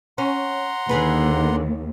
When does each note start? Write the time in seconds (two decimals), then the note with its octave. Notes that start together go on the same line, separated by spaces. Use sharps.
0.18 C#4 F#5 A#5 C6
0.89 D#2 D3 G#4 B4